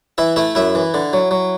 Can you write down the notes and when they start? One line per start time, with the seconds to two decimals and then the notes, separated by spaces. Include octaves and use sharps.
0.18 E3 E4 E5
0.36 A3 E4 E5
0.55 F#2 E4 E5
0.75 E3
0.94 D3
1.13 F#3
1.31 F#3